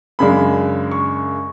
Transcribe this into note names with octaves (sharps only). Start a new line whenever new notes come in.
F#2 C#3 G#3 D4 B5
C#6